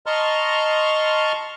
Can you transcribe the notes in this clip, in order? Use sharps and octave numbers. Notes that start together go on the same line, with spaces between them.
D#5 A5 A#5 C6 C#6 F6